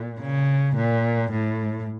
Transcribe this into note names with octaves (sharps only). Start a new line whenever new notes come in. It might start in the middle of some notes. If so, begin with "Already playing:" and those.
Already playing: A#2
C#3
A#2
A2